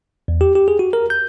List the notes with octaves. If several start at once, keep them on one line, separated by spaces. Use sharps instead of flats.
E2
G4
G4
G#4
F#4
A#4
G6